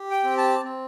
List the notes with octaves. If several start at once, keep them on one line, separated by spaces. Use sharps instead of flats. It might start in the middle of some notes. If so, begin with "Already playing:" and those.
Already playing: G4
G5
C4
A5
C4